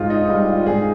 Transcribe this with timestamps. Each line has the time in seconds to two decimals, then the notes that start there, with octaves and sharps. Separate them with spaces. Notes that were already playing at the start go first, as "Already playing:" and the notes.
Already playing: G#2 F4
0.10 D#4
0.29 G3 F4
0.48 F4
0.66 G#2 G#4